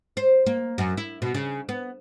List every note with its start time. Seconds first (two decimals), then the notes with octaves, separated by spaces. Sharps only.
0.17 C5
0.46 A#3
0.78 F#2
0.97 E4
1.22 B2
1.34 C#3
1.69 B3